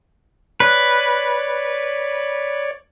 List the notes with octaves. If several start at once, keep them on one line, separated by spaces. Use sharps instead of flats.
B4 C#5 D5